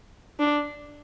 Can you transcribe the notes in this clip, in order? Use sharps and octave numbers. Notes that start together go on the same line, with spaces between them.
D4